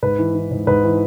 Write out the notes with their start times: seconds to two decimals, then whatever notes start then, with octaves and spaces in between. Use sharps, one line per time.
0.03 G#2 B4
0.19 E3
0.35 E3
0.51 G#2
0.67 G#2 B4
0.84 E3